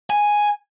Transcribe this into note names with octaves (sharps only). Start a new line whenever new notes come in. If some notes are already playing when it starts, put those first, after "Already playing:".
G#5